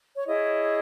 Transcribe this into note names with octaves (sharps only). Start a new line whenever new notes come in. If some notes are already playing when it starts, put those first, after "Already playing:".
C#5
E4 G#4 C#5 D#5